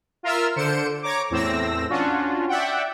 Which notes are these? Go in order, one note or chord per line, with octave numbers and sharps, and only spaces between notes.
F4 A#4 E5 E6 F6
D3 C5 C#7 D7 E7
C#5 A#5 D6
E2 A2 C4 E6 A#6
C#4 D4 F4 F#4
D5 E5 F#5 G5